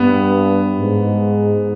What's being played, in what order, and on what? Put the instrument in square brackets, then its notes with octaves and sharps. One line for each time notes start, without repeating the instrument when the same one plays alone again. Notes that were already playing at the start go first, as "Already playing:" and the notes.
Already playing: [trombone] G2 [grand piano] B3
[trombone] G#2